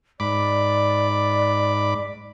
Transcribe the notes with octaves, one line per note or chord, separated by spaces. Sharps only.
G#2 D5 B5 D6